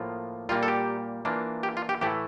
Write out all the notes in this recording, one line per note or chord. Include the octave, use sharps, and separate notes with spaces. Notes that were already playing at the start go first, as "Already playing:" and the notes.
Already playing: A2 F3 A#3 F4
A#2 G3 A#3 F4
A4
G4
E3 A#3 D4 F4
G4
F4
G4
A2 E3 A3 E4 G4